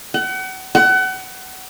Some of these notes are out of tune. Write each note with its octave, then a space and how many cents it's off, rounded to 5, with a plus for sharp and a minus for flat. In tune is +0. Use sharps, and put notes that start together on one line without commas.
F#5 +35
F#5 +30